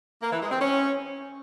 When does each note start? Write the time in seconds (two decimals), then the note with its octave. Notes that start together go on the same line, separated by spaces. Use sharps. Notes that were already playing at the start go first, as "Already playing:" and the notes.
0.23 A#3
0.32 E3
0.42 G#3
0.51 C4
0.61 C#4